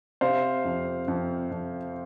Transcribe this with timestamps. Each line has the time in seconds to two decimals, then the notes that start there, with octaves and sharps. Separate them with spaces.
0.21 C3 C5 F5
0.65 F2
1.08 F2
1.51 F2